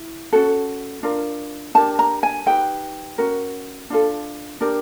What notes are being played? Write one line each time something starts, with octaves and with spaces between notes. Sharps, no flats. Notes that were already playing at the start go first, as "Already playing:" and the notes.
Already playing: E4
C#4 F#4 A4
D4 F4 A#4
D4 G4 A#4 A5
A#5
G#5
D#4 G4 B4 G5
C#4 F#4 A#4
D4 F4 A4
D4 G4 A#4